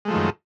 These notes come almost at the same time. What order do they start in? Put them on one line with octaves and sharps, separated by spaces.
G#3 A3 F3 D#3 F#2